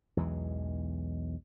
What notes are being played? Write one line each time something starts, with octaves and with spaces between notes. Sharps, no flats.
B1 E2 E3 G#3